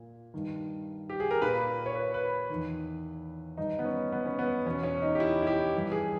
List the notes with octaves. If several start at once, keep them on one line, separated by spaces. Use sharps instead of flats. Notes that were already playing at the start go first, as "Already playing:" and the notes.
Already playing: A#2
G2 D#3
G4
G#4
A#4
A#2 B4
C#5
B4
B4
E2 D#3
G2 D#3 D#4
B3
C#4
B3
C#4
B3
E2 B2 C#4
C#4
D#4
G4
E4
E4
G4
G2 E3
G#4